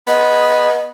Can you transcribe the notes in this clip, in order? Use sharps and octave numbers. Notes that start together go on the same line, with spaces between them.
B3 D#5